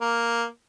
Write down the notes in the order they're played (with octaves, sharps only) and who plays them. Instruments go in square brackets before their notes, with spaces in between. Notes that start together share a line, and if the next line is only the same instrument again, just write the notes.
[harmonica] A#3